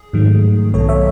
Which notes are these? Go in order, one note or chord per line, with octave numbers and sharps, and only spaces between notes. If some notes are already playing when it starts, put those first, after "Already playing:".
Already playing: G#4
G#2 D#3 F#3 A3
B1 B2 F#3 B3 A4 C#5
C#5 E5